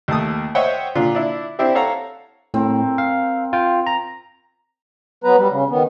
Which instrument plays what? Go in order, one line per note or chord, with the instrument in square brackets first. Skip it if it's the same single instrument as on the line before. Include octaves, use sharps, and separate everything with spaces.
[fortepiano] D#2 A3 A5 D#6
C5 C#5 D#5 E5 F#5 G5
A#2 D3 F4
D4 E4
C4 D4 E4 G4
A4 C#5 F5 F#5 A#5
[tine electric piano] A2 [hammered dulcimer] C4 A#4
[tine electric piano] F5
F4 G5
A#5
[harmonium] F#3 B3 B4 A#5
G3
C#3
D#3 B3